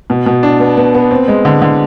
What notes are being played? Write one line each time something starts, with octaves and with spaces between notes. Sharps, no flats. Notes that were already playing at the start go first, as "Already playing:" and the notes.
B2
B2
D4
B3
B3
B3
C4
G#3
D3
D3